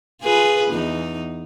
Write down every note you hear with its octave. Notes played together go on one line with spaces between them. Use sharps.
F4 G#4 B4
E2 D#4